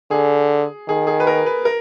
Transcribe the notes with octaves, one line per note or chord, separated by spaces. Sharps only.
D3 G#4
D#3 G#4
G#4
B4
A#4
B4
A#4